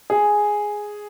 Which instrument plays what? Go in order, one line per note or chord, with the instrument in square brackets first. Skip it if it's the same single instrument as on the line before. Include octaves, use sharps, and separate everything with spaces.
[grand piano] G#4